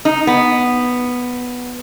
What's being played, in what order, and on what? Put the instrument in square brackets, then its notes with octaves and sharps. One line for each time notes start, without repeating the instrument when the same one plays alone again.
[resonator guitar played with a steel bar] D#4
B3